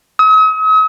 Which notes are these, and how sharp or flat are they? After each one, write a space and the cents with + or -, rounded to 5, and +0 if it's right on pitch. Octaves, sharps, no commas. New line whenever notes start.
D#6 +45